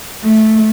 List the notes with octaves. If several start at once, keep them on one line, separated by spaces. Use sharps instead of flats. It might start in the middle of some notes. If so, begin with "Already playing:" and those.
A3